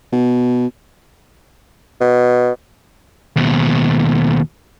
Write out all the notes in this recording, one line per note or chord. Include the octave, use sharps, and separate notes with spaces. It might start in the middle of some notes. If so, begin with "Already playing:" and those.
B2
B2
D#2 B2